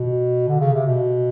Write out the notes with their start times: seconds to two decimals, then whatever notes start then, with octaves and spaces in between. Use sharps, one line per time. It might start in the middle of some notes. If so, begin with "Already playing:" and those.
Already playing: B2
0.48 D3
0.60 C#3
0.73 C3
0.86 B2